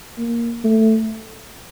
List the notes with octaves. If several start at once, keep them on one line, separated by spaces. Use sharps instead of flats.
A#3
A3